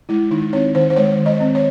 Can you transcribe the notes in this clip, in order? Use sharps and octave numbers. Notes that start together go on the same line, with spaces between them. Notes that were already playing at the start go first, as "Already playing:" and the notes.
G#3 E4
D#3 D#4
C4 C#5
D#3 C5
C5
G#3 C#5
D#3
D#5
C4
C#5